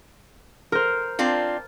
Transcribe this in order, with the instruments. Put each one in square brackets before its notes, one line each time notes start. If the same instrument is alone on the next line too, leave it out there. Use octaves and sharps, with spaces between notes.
[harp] A#4 C5
[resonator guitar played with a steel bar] C4 D4 F4